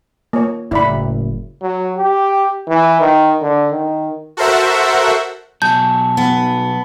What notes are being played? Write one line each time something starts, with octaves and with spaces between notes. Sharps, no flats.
A#3 C#5
F#1 A2 E4 D5 B5
F#3
G4
E3
D#3
D3
D#3
F#4 A4 A#4 C5 E5 F#5
B2 F#3 G#4 A5 G6
B3